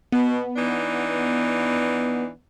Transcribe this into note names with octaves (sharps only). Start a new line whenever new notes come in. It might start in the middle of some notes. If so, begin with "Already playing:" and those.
B2 B3
E3 D4 D#4